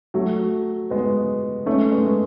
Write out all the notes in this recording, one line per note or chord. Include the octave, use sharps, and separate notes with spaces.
F#3 A3
G#3 B3
A3 C#4
G#3 B3